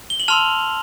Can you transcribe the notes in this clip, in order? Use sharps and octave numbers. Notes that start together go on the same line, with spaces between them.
G7
F#7
A5 C6 E6 F6 F7